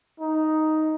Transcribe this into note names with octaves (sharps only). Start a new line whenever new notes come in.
D#4